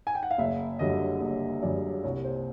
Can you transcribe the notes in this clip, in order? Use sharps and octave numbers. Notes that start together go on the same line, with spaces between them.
G#5
G5
F#5
F5
F#1 E5
F#2 D3 G3 D#5
F#1 D#5
F#2 D3 G3 D5
C2 C#5
C5